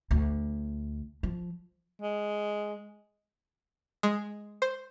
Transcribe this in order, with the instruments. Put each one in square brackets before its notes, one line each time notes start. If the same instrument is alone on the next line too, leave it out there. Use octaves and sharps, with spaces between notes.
[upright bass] D2
F3
[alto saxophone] G#3
[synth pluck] G#3
C5